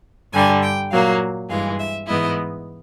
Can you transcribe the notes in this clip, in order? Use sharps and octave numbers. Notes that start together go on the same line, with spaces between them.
G2 D3 G3 G#5
G5
A#2 F#3 A#3 F5
G2 E3 G#3 F5
E5
G#2 E3 G#3 B3 E4 D#5